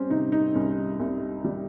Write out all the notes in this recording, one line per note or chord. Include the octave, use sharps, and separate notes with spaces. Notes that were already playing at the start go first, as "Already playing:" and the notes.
Already playing: G3 C4 C#4
C3 D#4
D#4
C2 C#4
C2
G3